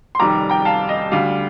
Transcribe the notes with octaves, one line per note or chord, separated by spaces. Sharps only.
C6
F1 F2 D#3 G3 A#5 D6
G5 A#5
F5 A5
D#5
D2 D3 G3 F5